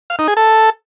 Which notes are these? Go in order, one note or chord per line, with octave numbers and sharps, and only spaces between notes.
F5
D#4
G#4
A4